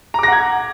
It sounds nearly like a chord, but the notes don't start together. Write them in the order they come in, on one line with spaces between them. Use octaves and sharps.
A#5 D6 A#6 F#5 G#6